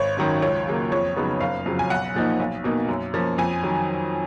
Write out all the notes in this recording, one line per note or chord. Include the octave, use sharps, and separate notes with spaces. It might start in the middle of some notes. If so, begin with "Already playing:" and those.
Already playing: G#1 C#5
F#2 D#3 F#3 C#4
C#2 C#5
C#3 F#3 A#3
F2 C#5
C#3 F#3 B3 D#4
F#1 F5
F2 C#3 F#3
G#5
B1 F#5
A#2 F3 A#3 D#4
B1
B2 A#3 D#4
F#2
F3 A#3 C#4
F2 G#5
D#3 F#3